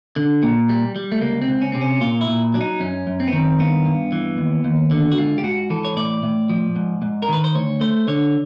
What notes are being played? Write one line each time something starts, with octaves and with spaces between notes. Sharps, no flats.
D3
A#2
G3
G3
A3
C#2 A#3
C4
C#2
C#4
C3 C4
C#4
A#2 F4
E4
A#2
F#3 D4
D#4
F#2 C#4
F#2
C4
B3
D#3 C4
G2 B3
G2
E3
D#2
D#2
D3
F#4
G#2 F4
G4
G#2 F#4
E3 A4
C#5
A2 D5
A2
F3
G#2
G#2
A#4
D#3 B4
C5
D2 C#5
A3 C5
D3 C#5